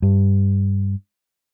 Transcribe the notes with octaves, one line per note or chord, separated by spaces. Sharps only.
G2